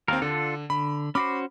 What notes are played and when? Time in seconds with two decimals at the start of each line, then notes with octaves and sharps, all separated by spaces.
0.08 D#2 C4 A#4 F5
0.22 D3 D4 F4 A4
0.70 D3 B5
1.15 C#4 F#4 C5 B5 D6